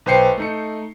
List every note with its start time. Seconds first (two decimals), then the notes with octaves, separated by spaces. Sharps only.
0.06 B1 B4 C5 G5 C7 C#7
0.38 A3 D#4 C#7